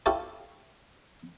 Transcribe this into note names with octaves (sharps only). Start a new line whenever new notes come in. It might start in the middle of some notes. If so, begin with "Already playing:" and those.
E4 F4 G4 A4 C#5